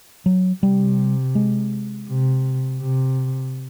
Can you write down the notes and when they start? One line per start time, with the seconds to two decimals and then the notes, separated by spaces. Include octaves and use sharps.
0.26 F#3
0.62 C3 G3
1.35 G#3
2.08 C3
2.81 C3